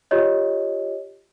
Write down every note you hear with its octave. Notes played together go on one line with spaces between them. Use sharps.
F4 G4 C#5 D#5